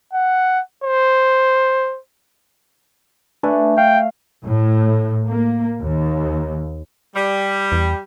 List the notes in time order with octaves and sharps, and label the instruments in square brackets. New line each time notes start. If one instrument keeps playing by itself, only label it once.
[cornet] F#5
C5
[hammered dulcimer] A3 [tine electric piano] D4 B4 G#5
[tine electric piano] F5 [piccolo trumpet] G5
[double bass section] A2
A#3
D#2
[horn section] G3
[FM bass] E2